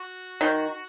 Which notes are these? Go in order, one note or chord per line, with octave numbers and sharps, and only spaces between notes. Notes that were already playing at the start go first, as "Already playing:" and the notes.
Already playing: F#4
D#3